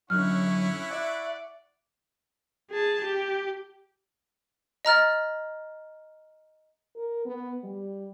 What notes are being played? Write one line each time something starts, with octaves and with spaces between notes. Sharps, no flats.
F#2 D3 C#4 E4 F#5 C#6 F6 F#6
D5 E5
G#4 A5
G4
D#5 A#5 F6 A6
A#4
B3
G3